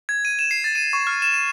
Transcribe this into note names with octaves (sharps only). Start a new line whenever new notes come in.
G#6
D#7
E7
C7
A6
D#7
C#6
F6
E7
D#7